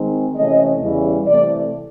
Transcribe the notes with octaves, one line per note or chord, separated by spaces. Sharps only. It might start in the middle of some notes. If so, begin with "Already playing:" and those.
Already playing: D#3 G#3 C4 D#4
C3 E3 A3 C#4 D#5
E2 C#3 E3 G3
C3 E3 A3 C4 D5